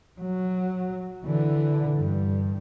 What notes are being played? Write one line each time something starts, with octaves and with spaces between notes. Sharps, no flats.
F#3
D3 E3
G2